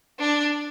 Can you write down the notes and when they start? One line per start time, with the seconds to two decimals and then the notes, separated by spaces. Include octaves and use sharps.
0.19 D4